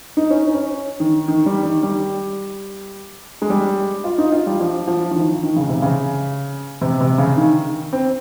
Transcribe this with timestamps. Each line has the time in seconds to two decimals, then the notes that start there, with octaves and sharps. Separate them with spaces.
0.17 D#4
0.30 C#4
0.35 D#4
0.54 C#4
1.00 D#3
1.28 D#3
1.46 G3
1.65 D#3
1.83 G3
3.42 G#3
3.50 G3
4.04 F4
4.18 D#4
4.32 F4
4.46 G3
4.60 F3
4.87 F3
5.11 F3
5.15 D#3
5.43 D#3
5.56 C#3
5.69 C3
5.82 C#3
6.81 C3
7.01 C3
7.18 C#3
7.37 D#3
7.93 C4